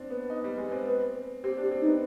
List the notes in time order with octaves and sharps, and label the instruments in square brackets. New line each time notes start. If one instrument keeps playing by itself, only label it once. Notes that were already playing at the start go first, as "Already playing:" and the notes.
Already playing: [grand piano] C4 D4
B3
D#4
G3
G#3
B3
C4
[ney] B4
[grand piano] C4 [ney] G4
[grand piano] D4
[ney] G4
[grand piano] C4
[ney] D#4
[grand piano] B3